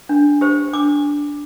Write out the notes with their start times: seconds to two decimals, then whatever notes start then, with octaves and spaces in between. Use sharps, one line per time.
0.09 D4
0.41 G4 C5
0.73 D4 D6